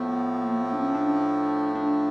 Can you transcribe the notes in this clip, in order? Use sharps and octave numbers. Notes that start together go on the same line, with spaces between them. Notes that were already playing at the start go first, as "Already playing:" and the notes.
Already playing: A2 F3 A3 B3
A#3
B3
D4
C#4
D4
D4